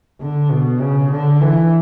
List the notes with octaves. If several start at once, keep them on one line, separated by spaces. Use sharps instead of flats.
D3
B2
C#3
D3
E3